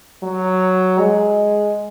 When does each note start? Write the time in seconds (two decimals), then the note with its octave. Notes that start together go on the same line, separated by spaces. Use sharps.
0.23 F#3
0.99 G#3